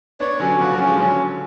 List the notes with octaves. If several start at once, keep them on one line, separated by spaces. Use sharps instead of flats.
B3 D4 C#5
D3 F#3 C#4
C#3 F3 F#4
D3 F#3
C#4
F3 G#3
D3 F#3 C#4